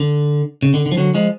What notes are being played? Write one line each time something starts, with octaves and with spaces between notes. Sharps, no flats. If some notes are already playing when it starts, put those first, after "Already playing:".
Already playing: D3
C#3
D3
D3
F3
D3 F#3
F3 G#3